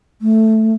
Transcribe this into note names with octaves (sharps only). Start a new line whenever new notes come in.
A3